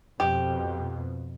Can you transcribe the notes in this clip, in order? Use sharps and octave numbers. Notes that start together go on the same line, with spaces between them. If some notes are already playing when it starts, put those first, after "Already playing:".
F2 B2 G4